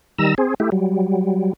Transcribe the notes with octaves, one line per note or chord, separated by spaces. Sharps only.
D#3 G3 A#5 E6
C4 G#4
A3 E4 G4
F#3 G3